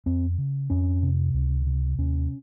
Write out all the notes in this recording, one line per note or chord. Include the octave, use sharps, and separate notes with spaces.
F2 C4
C#3
F2 C#4
C3
C#2
C3
D#2 C#4